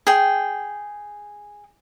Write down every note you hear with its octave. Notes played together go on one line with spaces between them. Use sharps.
G#4 G5